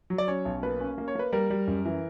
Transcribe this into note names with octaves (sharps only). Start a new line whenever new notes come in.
F#3
D5
C#4 C#5
B1
A#3 B4
C#4
A#3
C#5
A#3 B4
G3 A#4
G3
F#2
E3